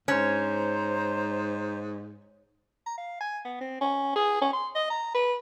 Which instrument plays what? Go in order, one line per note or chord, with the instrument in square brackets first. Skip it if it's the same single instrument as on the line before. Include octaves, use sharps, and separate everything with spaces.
[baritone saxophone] G#2 [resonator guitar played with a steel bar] C#4 [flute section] C5 A#5
[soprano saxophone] A#5
F5
G#5
B3
C4
C#4
G#4
C#4
C6
D#5
A#5
B4